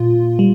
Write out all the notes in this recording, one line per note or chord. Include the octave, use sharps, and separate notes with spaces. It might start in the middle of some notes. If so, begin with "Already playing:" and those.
Already playing: A#2 F4
G3